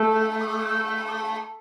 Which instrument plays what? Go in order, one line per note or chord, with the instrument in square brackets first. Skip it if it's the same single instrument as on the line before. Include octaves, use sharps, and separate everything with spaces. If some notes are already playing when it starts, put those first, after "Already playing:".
Already playing: [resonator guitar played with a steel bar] A3